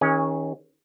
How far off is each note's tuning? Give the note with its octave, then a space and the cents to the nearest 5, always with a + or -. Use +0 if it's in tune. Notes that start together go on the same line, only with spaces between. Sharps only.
D#3 +30 C#4 -10 G#4 -25